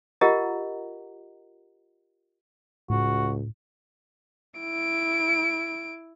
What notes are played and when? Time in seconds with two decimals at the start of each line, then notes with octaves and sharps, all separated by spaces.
0.21 F4 G4 A#4 D#5 F#5 A#5
2.90 C#2 A2 F#4
4.60 E4 D7